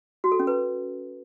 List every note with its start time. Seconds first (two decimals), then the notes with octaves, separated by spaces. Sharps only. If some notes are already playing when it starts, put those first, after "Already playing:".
0.24 F#4
0.32 A4
0.39 C#4
0.47 B4